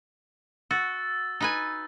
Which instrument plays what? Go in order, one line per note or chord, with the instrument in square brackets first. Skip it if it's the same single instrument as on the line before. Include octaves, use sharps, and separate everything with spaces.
[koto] F#4 [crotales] E6 A6
[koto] D#4 B4 G#5